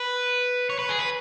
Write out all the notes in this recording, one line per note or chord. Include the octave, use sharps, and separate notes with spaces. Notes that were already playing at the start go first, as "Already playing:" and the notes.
Already playing: B4
C#5
B4
G#4
B4